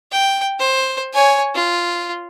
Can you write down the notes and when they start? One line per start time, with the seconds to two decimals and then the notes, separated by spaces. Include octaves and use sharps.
0.11 G5
0.59 C5
1.13 C#5 G#5
1.55 F4